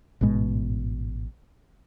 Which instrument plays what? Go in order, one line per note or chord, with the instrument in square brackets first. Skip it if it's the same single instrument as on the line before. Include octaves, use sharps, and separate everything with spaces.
[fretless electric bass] A1 G#2 B2 G#3